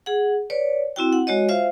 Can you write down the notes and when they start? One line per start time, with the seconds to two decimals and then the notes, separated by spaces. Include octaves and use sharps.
0.06 G#4 F#5
0.50 B4 C#5 D5
0.96 C4 E4 F#4 G5
1.13 F#5
1.27 G#3 F#4 C#5 D#5
1.49 F4 C5 E5 F5